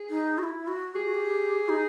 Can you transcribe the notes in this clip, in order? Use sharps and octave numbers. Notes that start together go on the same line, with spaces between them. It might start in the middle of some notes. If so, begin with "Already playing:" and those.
Already playing: G#4
D#4
F#4
E4
F#4
G4 G#4
F#4
G4
D#4